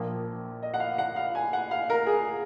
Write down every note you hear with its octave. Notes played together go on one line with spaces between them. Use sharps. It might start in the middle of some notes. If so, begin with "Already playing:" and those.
Already playing: A#1 A#2 F3 A#3
D#5
F#5
F5
F#5
F5
G#5
F#5
F5
A#4
G#4